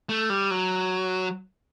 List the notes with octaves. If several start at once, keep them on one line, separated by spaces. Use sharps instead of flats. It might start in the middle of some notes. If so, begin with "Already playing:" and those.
A3
G3
F#3